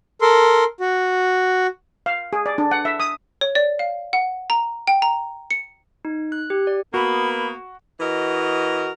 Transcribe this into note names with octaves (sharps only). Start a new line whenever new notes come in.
A4 A#4 C6
F#4
F5
G#4
D5
D4
F#5
E5
D#6
C#5
D5
F5
F#5
A#5
G5
A#5
C#7
D#4
F#6
G4
D5
A#3 B3 F#4 B5
E3 F#4 A#4 D#5